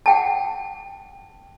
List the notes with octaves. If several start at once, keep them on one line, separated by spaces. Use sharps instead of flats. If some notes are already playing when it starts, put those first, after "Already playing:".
F#5 G5 A5